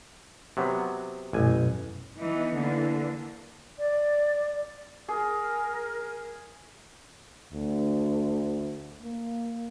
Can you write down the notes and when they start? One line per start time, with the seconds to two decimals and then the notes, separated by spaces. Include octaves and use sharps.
0.57 C3 F#3 B3
1.33 A1 F#2 B2 G#5
2.18 E3 B3 D#4
2.54 D3 E3 A#3
3.78 D5
5.08 G#4 A#4
7.53 D2
9.02 A#3